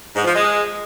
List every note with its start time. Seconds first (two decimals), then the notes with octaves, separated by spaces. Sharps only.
0.15 G#2
0.24 F3
0.33 G#3